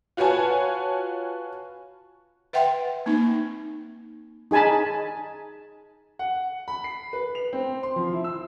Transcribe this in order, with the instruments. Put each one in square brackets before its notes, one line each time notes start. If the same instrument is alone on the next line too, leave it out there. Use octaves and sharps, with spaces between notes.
[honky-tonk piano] F4 F#4 B4 C#5 G#5 A5
[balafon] B4 E5 F#5 G5 C6
A#3 C4 D#4
[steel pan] D#4 G#4 G#5 A5 B5
[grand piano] F#5
B5
C7
B4
F7
C4
C6
F3
E4
E6